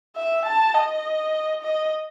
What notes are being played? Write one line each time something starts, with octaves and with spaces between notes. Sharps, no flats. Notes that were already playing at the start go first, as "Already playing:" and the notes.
E5
A5
D#5
D#5